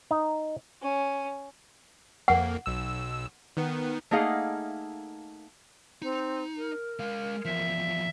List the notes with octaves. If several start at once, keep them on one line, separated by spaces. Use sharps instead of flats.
D#4
C#4
F2 A#3 F#5
B1 E6
D#3 B3
A3 A#3 D#4 G#4 F5 F#5
C4 D#4
A#4
G#3 F5
E2 F3 E5